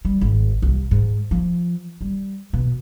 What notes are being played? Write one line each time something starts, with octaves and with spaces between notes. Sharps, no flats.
G3
G#1
C2
G#2
F3
G3
B2